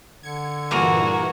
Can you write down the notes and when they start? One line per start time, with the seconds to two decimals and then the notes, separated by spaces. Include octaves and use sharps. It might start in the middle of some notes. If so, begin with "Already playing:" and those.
0.23 D3 G#6 C#7
0.71 G2 A#2 E3 A#3 F#4 G#4 A#4